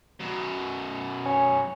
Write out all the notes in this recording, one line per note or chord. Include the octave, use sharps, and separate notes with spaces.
F#2 B2
C#4